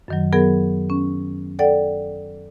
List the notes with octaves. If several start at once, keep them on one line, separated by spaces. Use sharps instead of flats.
F#2 D#3 F#3
F#3 B3 G#4 A#4
C#4
A4 D5 F#5 G5